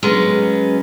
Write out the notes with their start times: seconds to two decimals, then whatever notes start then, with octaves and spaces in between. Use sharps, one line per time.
0.03 F#3 G#3 B3 C#4